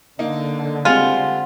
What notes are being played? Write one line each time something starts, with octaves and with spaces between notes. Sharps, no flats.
D3 A#3 D#4
G3 G#3 C4 F4 F#5 G#5